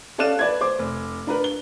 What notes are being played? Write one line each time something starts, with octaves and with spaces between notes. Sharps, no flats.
C#4 A4 D5 F5 F#6 E7
B4 D5 G#6
C5 D6
F1
D4 A#4 B4
G7